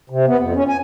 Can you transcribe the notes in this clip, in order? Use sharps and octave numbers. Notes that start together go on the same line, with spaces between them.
C3
B3
F2
C#4
G#5